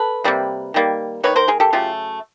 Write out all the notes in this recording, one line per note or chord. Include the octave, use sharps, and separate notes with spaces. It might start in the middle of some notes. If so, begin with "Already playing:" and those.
Already playing: A4 B4
C3 D#3 G3 A#3
D#3 G3 A#3
D#3 G3 A#3 B4 C#5
A#4 C5
G#4 A#4
G4 A4
C#3 F#3 A3 F4 G4